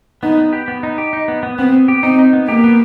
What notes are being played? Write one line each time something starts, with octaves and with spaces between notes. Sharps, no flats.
B3 D#4
B3
G4
B3
D#4
G4
D#4
B3
B3
B3 C4
B3
G4
C4 D#4
D#4
B3
A#3 G4
B3